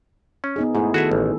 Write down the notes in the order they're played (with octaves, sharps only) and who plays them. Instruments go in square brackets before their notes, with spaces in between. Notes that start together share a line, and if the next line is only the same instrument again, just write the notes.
[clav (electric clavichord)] C#4
[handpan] B3 D#4 G#4
[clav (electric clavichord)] G#2 [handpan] A3 E4 G#4
[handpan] D#3 A4 [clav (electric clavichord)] F#4 G#4 E5
[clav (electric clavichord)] A1